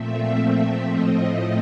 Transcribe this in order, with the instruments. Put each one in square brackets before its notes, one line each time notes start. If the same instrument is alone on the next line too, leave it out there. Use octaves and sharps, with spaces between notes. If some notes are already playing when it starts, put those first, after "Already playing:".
Already playing: [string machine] A#2 F3 A3 C4 E5
A2 F3 A3 C4 D#5